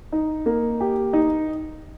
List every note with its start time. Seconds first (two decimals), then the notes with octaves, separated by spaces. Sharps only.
0.12 D#4
0.46 A#3
0.80 G4
1.13 D#4